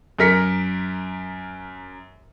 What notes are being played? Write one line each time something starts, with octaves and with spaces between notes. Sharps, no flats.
F#2 A#4 B6 C#7